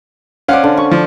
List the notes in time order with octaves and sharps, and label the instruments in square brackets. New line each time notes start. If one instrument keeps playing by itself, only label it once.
[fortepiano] C#4 F5 F#5 [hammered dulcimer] C5 D5
[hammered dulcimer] D3
C#6
[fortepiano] F3